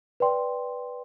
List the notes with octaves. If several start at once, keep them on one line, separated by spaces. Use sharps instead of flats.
B4 D5 G5 C6